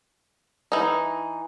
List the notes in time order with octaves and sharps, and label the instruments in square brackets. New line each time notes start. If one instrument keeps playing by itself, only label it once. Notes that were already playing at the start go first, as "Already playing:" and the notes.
[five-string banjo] E3 D#4